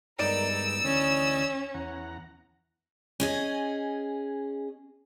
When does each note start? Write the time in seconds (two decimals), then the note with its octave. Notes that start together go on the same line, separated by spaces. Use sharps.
0.19 G2 G#3 B3 D#4 A#4 D5 E6 D7
0.84 D2 E3 C#4 D#6
1.74 E2 F#5 A#5
3.20 C#4 G#4 D#5